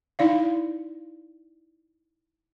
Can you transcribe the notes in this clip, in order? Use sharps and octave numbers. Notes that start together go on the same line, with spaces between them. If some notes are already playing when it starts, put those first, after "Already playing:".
D#4 E4 D5 F5